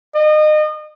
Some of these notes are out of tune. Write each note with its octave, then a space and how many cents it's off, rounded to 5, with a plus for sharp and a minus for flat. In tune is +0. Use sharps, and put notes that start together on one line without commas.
D#5 -30